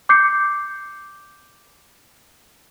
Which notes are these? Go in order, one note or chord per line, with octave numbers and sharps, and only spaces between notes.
D6 G6 C7 C#7